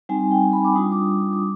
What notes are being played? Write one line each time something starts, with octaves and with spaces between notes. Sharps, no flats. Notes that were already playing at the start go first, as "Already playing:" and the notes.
G3 C4 D#4 G#5
G#5
G5
G#5
B5
D6
G3 D4 F4 D#6
D6
D#6
D6